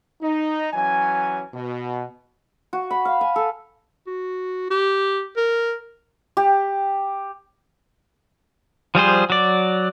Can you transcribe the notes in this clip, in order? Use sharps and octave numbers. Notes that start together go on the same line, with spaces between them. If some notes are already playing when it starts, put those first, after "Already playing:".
D#4
E3 F#3 C#4 G#5
B2
F#4
B5
F5
G#5
A4
F#4
G4
A#4
G4
F3 G3 G#4 C5
F#3 D5